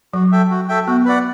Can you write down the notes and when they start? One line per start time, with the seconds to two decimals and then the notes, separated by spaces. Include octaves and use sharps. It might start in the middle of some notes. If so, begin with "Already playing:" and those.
0.13 F#3 F#4
0.32 A4 E5 G5
0.51 F#4
0.69 A4 E5 G5
0.87 B3 F#4
1.05 B4 D5 F#5